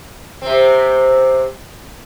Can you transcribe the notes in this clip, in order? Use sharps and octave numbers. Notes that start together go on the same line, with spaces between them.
C3 C4